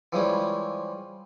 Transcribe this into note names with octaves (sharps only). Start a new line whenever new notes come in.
E3 F3 G3 G#3 C#4 E4